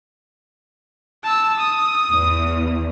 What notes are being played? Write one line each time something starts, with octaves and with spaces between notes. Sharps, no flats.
A5 E6
D#6
E2